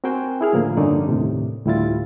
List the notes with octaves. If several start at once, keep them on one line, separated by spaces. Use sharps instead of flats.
C4 F#4 A#4 C5 G5 G#5
E4 G#4 F6
A2 D3 F3 A#3
G2 D3 C#4 D#4 A#4 D5
D#2 A2 C3
D2 A2 G3 E4 F4 A6